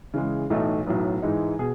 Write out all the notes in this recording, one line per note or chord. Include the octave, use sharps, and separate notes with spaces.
C#3 E3 G#3
B1 A2 E3 A3 D#4
B1 A2 F#3 B3
G#2 E3 G#3 D#4
B2 G#4